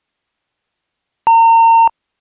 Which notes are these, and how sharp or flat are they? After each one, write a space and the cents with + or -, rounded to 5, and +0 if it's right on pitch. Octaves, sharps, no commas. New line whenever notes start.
A#5 -35